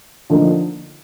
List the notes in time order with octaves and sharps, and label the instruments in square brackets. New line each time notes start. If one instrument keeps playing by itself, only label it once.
[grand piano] D3 F3 A#3 D#4